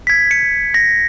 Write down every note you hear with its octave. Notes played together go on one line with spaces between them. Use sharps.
G#6 B6
C#7
A#6